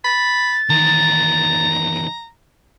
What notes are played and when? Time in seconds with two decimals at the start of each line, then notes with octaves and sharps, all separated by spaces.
0.04 B5 A6
0.70 E2 D#3 A#5